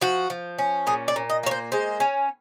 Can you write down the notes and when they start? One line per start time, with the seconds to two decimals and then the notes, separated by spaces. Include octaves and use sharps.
0.01 F3 F#4
0.30 F3
0.58 C#4
0.87 A#2 G#4
1.08 D5
1.16 A#2
1.30 D#5
1.43 A#3 C#5
1.51 C5
1.72 G#3 C5
2.00 C#4